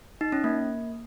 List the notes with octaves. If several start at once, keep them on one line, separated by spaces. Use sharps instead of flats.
D#4
C#4
A#3